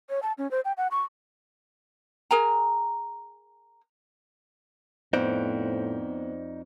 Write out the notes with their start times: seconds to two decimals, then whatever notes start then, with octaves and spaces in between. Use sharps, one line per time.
0.09 C#5
0.23 A5
0.38 C#4
0.51 C5
0.65 G5
0.77 F#5
0.91 C#6
2.31 G#4 A#4 G#5 A#5
5.13 F2 A2 B3 D#4 C5 D5 F#5